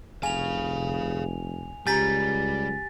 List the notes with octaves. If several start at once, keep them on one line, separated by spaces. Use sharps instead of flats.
F1 G#4 F5 G#5 F7
C#2 G3 G4 G#5 A#5 A6 B6